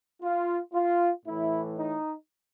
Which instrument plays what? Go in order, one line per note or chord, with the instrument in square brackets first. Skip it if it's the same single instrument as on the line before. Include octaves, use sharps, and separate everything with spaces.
[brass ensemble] F4
F4
A2 E3 E4
D#4